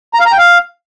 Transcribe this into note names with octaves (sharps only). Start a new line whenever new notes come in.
A#5
F5
A#5
G5
F5